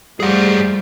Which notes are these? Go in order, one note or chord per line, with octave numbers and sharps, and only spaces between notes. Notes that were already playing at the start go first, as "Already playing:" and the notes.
F3 G3 A3 G#4 F#5